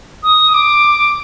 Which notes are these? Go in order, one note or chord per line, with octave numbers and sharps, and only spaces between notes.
D#6
D6